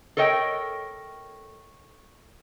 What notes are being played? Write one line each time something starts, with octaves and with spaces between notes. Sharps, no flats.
A4 A#4 C#5 D#5 G5